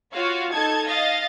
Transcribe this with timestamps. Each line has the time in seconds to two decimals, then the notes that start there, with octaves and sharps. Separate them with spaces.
0.13 F4 F#4 C#5 F5
0.53 D#4 A4 A5 G#6
0.86 D#5 F5 A6